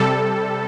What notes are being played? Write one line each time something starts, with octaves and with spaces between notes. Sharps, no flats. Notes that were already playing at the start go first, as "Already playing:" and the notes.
Already playing: C3 G3 A4